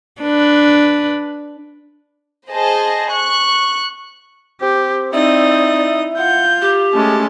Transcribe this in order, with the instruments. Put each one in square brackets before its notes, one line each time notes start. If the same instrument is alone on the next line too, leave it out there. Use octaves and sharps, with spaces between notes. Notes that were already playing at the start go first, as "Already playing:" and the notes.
[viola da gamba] D4 B4
[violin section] G#4 C5 D#5 A5
C#6 F#6
[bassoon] C4 [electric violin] G4
[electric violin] C4 [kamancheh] D#4 D#6 [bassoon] E4 [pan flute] D5
[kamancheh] F4 [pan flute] F#5 [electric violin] G6
[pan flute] G4
[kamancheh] G#3 A5 [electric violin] A3 C#4